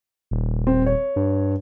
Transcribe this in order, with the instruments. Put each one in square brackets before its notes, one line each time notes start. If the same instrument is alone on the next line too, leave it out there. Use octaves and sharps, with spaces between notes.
[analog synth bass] D#1
[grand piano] C4
C#5
[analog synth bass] G2